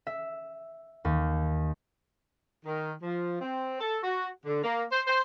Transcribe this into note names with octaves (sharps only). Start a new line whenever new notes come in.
E5
D#2
D#3
F3
C4
A4
F#4
D3
A#3
C5
C5